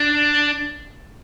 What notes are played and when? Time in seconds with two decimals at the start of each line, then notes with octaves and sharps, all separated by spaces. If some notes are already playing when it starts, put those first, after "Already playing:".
Already playing: D4